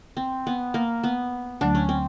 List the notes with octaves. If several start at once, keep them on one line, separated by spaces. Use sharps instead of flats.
C4
B3
A#3
B3
D2 D3 F#3 A3 D4
C#4
C4